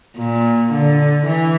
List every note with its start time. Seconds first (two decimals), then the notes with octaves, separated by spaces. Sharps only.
0.17 A#2
0.72 D3
1.27 E3